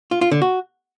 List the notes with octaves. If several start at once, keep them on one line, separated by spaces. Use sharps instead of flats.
F4
F4
D3
F#4